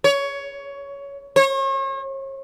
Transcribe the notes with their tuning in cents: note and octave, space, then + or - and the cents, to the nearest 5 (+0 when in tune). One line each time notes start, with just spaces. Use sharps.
C#5 +15
C#5 -40